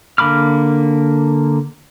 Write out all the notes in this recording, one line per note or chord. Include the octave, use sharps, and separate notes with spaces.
D3 A#3 B5 D6 F6